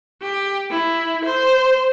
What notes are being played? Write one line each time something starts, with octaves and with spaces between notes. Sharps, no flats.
G4
E4
C5